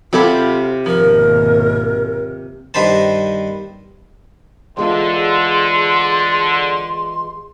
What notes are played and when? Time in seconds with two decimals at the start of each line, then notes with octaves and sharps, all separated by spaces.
0.13 C3 F#3 C4 F4 G4 A4 B5
0.86 G#1 D#2 B2 F3 A#4
2.74 G2 D#3 B4 C5 A5
4.77 E2 D3 G#3 F4 C6